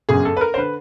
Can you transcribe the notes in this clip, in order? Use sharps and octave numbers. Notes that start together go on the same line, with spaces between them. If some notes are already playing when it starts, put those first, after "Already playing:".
G1 F#2 C#3 G#4
A4
B4
A#4
C5
D3 B4